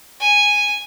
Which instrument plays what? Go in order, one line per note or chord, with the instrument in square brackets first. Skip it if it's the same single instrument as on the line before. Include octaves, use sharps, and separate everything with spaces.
[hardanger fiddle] G#5